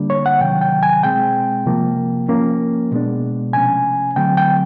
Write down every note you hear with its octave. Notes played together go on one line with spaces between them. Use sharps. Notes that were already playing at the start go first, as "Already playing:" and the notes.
Already playing: D3 G3 A#3 D4
C#5
F#5
C3 D#3 F#3 G5
G5
G#5
B2 G#3 C4 G5
C3 F3 A#3
F3 A#3 C#4
B2 G#3 B3 D4
C3 F3 A3 C#4 G#5
D3 F#3 A3 C4 G5
G5